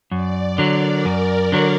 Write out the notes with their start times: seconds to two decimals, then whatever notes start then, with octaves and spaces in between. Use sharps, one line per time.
0.11 F#2 D5
0.43 D5
0.58 D3 F#3
0.74 A#4
1.05 F#2 A#4
1.52 D3 F#3